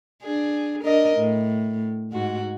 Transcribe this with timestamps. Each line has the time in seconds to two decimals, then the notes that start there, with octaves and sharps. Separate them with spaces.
0.23 D4 G#4
0.82 D4 A#4 D#5
1.17 A2
2.12 G#2 F#4